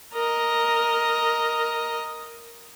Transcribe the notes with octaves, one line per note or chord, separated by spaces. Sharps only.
A#4 D#5